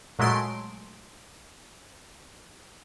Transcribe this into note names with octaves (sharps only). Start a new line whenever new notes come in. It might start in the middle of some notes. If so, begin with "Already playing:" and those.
A#2 F#3 G#3 A3 C6 D7